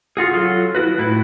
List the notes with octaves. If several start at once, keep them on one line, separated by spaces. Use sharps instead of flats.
F4 F#4 G#4
F#3 F4 A4
E4 F#4 B4
A2 E4 B4